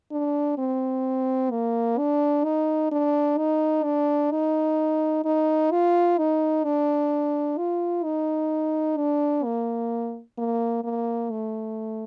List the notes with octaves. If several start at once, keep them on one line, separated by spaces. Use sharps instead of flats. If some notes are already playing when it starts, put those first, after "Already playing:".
D4
C4
A#3
D4
D#4
D4
D#4
D4
D#4
D#4
F4
D#4
D4
F4
D#4
D4
A#3
A#3
A#3
A3